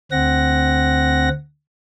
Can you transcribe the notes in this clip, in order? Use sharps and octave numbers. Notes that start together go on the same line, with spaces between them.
D2 C4 F#5 A#6